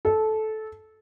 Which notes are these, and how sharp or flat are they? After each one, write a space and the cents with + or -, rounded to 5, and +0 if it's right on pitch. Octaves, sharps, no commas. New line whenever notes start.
A4 -15